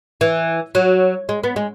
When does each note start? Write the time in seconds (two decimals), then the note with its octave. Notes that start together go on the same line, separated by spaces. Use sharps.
0.21 E3
0.75 F#3
1.29 G#3
1.44 B3
1.56 G#3